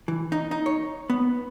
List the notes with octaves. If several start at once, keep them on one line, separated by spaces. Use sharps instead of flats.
E3
D#4
D#4
C#5
B3